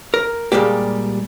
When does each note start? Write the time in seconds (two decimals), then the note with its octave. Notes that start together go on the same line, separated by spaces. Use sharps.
0.14 A#4
0.52 A#2 G3 G#3 A#3 G4